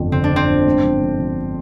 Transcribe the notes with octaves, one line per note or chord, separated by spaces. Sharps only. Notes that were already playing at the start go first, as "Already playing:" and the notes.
Already playing: G1 F2 D3
D3 C4
D4
D3
C4
G1
G#2
F3
F3
F3